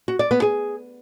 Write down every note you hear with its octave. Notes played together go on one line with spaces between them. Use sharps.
F#4
D5
B3
G#4